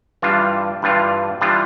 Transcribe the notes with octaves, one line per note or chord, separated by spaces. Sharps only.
G2 E3 G3 D4 F4
G2 E3 G3 D4 F4
E3 G3 D4 F4